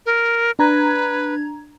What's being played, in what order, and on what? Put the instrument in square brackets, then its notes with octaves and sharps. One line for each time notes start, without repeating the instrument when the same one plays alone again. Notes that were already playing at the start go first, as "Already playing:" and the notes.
[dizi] A#4
[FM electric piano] D4 A#5 G#6 [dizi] B4